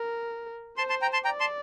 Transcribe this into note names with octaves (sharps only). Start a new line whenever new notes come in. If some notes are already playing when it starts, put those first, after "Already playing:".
Already playing: A#4
C5 A5 C6
A5 C6
G5 A#5
A5 C6
D5 G5 A#5
A5 C6